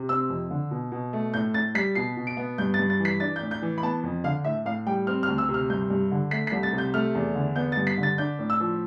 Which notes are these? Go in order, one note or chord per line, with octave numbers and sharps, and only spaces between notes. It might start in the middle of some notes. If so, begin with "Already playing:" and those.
Already playing: C3
C4 E6
F2
D3
B2
B2
A3
A2 G6
A2 A6
G3 B6
B2 C7
B2
D7
B3
G2 G6
A6
G2
A6
E3
B6
D4 A6
G6
A2
G6
E3
B5
B3 A5
F2
D3 F5
A2 E5
A2 F5
G3 G5
C4 F6
F6
D2
E6
C3
F6
G2 G6
G2
D3
A3 B6
B6
C2
A6
C3
G6
A3 F6
E2
D3
B3 G6
A6
G2
B6
D3
A6
D4 G6
A2
E6
F3